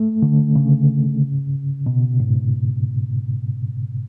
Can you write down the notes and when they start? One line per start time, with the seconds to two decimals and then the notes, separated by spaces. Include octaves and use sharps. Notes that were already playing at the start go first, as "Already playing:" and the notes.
Already playing: A3
0.22 D3
0.56 C#3
1.86 B2
2.20 G#2